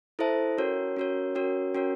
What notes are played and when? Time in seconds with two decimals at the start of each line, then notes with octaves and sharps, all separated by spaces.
0.19 E4 A4 C5 E5 A5
0.58 C#4 F#4 A#4 C#5
0.96 C#4 F#4 A#4 C#5
1.35 C#4 F#4 A#4 C#5
1.75 C#4 F#4 A#4 C#5